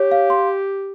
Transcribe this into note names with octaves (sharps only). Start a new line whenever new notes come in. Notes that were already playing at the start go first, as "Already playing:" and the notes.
Already playing: G4 C#5
F5
C6